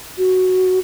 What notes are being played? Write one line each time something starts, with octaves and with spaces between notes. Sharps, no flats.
F#4